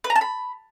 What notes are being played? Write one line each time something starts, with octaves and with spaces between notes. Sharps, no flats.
B4
A#5
A5
B5